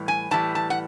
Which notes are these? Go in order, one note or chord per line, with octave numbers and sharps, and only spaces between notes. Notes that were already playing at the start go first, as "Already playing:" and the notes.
Already playing: A2 E3 G3
G#5
A2 E3 G3 A5
A5
F#5